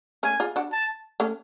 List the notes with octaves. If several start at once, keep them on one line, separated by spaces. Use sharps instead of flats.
A3 C#4 G#5
F4 G#4
D4 F#4
A5
A3 C#4